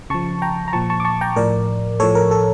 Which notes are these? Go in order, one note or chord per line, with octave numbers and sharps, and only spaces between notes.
C#3 F3 A5 C#6
G5 A#5
A#5
A#2 F3 A5 C#6
A5 C#6
D6
A5 C#6
G5 A#5
A2 F3 A#4 D5
A2 F3 A4 C#5
A#4
A4